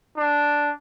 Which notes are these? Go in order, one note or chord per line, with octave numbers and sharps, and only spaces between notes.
D4